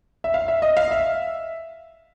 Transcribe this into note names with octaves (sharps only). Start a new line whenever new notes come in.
E5
F5
E5
D#5
F5
E5